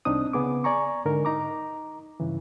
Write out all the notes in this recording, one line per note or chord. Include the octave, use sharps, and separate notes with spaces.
C2 C4 D4 D#4 D#6
C#3 B3 G#4 D6
D5 G#5 A#5 C#6
G#2 D3 D#4 A#4
D#4 A#5 D6
G2 C#3 E3